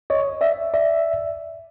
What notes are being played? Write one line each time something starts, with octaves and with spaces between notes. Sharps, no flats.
C#5 D#5
D5 E5
D5 E5